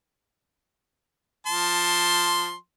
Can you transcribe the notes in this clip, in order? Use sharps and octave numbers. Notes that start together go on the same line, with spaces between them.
F3 A5 C6